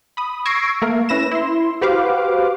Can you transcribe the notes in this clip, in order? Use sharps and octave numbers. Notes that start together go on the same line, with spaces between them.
B5 D#6
C#6 E6 G#6 A#6 C7 D7
A3 A#3 A#4
C#4 E4 B4 A#6 E7
E4 C6
F#4 G4 B4 C5 F5 D6